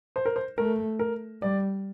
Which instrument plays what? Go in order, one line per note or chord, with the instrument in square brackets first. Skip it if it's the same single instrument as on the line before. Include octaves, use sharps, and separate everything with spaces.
[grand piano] C5
A#4
C5
[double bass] A3 [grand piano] A#4
[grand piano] A#4
[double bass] G3 [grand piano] D5